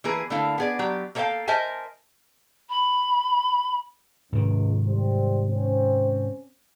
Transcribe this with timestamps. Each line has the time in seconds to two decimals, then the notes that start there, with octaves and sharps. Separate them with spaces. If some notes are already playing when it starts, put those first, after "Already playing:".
0.04 E3 A#3 G#4 B4
0.30 D3 A3 A#3 E4 F5
0.58 B3 G#4 D5
0.79 F#3 G4
1.15 A#3 A4 C#5 E5 F5 G5
1.48 A#4 C5 D#5 E5 G#5 A5
2.69 B5
4.33 C#2 G#2 C3 D#3
4.87 G3 C4
5.50 C4 C#4